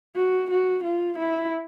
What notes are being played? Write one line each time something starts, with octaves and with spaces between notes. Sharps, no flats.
F#4
F#4
F4
E4